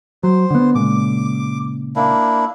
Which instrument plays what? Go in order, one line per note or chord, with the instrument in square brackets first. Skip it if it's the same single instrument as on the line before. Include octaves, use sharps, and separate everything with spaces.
[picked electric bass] F#3 [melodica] C5
[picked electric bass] D3 B3
[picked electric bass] A#2 C#3 G#3 [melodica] D6
[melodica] A#3 D4 E4